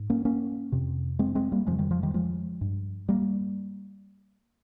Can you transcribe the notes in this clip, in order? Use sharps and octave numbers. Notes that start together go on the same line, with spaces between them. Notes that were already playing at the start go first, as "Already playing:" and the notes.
Already playing: G#2
A#3 C#4
A#3 C#4
F2 C3
G#3 C4
G#3 C4
G3 A#3
F2 C#3 F3 G#3
D#3 G3
F3
D#3 G3
F3 G#3
G2
G3 A#3